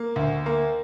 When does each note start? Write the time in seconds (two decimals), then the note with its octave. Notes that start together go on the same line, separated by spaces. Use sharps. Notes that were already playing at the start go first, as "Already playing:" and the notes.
Already playing: A#3
0.16 D2
0.46 A#3